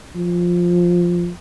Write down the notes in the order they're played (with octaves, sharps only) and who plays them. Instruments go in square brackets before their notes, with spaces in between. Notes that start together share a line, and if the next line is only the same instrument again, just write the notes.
[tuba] F3